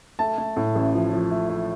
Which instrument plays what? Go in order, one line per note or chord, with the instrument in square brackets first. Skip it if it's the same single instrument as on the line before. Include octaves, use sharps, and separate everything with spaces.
[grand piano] A3 A5
A3
A2
A1
F3
F3
A3
A3